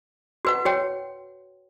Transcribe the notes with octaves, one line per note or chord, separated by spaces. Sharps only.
F#4 B4 F#5
F#4 C#5 G5